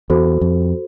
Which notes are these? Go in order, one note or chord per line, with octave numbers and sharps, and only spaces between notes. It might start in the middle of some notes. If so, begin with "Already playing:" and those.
E2 F#4 A4 C5
F2